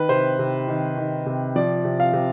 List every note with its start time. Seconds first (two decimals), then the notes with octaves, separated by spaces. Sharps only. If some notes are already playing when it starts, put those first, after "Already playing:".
Already playing: D#3 B4
0.09 C3 C5
0.39 C3
0.68 D#3
0.97 D#3
1.26 C3
1.56 F3 D5
1.85 C3
2.00 F5
2.13 C3